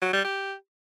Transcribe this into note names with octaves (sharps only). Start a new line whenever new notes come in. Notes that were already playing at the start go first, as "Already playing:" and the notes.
F#3
G3
G4